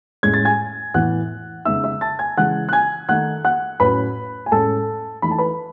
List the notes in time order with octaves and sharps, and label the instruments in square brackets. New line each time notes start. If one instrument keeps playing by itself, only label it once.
[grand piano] A2 G#3 C#4 G#6
A6
G#5 G#6
A2 E3 B3 F#5 F#6
C#3 G#3 B3 D#4 E5 E6
E5 E6
A5 A6
G#5 G#6
C#3 E3 G#3 C#4 F#5 F#6
F#6
G#5 G#6
D#3 A3 D#4 F#5 F#6
F#5 F#6
A2 F#3 C#4 B4 B5
G#5
A2 G#3 C#4 A4 A5
E3 A3 D#4 B5
A5
B4 B5